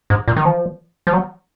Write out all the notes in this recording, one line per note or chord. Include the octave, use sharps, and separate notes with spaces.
G#2
A#2
D#3
F3
F3
F#3